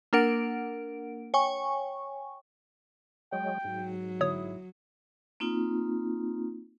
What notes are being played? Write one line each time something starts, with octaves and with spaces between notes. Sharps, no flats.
A#3 D4 A#4 F#5 D7
C#5 G5 G#5 C#6
F#3 G#3 G5
G#2 F#3
G1 E4 C#5 D#6
A#3 C4 D#4 F4